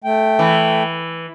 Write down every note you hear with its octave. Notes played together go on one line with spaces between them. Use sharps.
A3 G5
E3